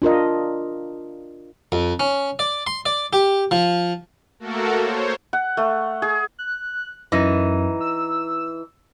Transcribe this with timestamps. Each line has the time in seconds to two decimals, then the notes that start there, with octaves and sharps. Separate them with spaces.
0.02 D4 F4 A#4 D#5
1.72 F2
2.00 C#4
2.39 D5
2.67 C6
2.86 D5
3.13 G4
3.51 F3
4.40 A3 A#3 F#4 A4 A#4
4.79 C5 C#5
5.33 F#5
5.57 A3
6.02 G#4
6.39 F#6
7.12 F#2 E3 D#4
7.80 E6